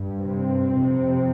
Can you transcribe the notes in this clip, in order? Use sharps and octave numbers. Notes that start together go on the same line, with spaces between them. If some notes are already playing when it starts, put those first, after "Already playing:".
Already playing: G2
C3 C4
F2 C3